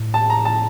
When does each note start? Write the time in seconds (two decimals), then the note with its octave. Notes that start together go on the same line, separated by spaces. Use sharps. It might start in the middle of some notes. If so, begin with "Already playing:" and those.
Already playing: A2
0.14 A5
0.30 A#5
0.45 A5